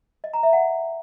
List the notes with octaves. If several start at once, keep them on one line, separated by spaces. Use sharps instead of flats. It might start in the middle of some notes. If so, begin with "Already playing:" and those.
D#5
A#5
E5
F#5